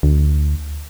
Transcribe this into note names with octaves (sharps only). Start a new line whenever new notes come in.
D2